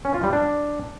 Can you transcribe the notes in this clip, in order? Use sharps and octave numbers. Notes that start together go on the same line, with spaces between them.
C#4
F4
G3
D4